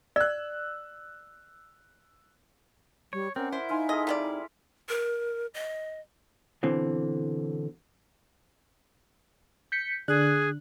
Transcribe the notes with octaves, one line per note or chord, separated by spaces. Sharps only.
D5 E6 F#6
G3 C#5
C4 C#4 A#4 D5 F#5
E4 C5
D#4 F5 G#5 C6
G#4 A4 D#5 F5
C3 G3 D5
A#4
D#5
B2 D3 E3 C4
G6 B6 C#7
D3 D4 G#4 F#6